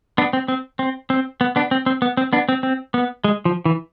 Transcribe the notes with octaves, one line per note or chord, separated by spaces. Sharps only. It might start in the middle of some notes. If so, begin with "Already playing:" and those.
B3 D4
C4
C4
C4
C4
B3
B3 D4
C4
C4
B3
C4
B3 D4
C4
C4
B3
G#3
F3
E3